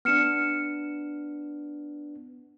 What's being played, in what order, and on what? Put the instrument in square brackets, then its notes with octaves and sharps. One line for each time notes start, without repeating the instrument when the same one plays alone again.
[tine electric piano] B3 D4 [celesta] F6 C#7 E7